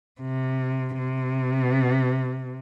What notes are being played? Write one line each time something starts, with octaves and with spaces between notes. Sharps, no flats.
C3
C3